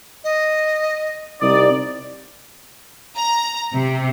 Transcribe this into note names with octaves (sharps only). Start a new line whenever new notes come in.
D#5
C2 D#4 D5 D#6
A#5
C3